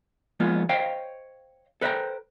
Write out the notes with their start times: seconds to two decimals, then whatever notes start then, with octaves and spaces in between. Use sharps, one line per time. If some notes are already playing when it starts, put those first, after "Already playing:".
0.40 F3 G#3 A#3 B3 F4
0.69 C5 C#5 D#5 F5 G5
1.81 A4 B4 C5 D#5 G5 A#5